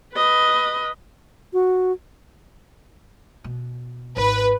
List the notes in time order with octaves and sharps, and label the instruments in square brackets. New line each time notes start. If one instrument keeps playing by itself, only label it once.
[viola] B4 D#5
[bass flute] F#4
[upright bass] B2
[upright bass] G#1 [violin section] B4